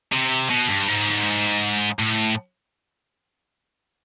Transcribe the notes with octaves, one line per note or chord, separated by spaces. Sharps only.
C3
B2
G2
G#2
A2